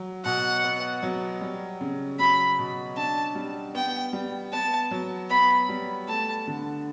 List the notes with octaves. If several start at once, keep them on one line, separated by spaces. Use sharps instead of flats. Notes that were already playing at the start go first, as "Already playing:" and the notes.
Already playing: F#3
B2 F#5
B3
F#3
G3
C#3
F#3 B5
B2
D4 A5
G3
B3 G5
G3
B3 A5
F#3
B3 B5
G3
A3 A5
D3